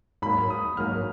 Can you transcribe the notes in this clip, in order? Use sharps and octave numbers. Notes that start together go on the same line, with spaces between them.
G#2 F#3 A#3 B5
D#6
G#2 F#3 A#3 F6